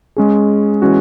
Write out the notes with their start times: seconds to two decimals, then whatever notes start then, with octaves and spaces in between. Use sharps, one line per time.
0.16 G#3 C#4 G#4
0.82 E3 G#3 C#4 F#4